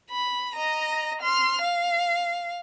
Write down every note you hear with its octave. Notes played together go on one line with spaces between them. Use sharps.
B5
D#5 A#5
C6 F6
F5